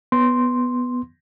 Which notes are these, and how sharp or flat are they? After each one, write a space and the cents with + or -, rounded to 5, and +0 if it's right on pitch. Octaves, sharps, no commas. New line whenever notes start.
B3 +0 C6 +0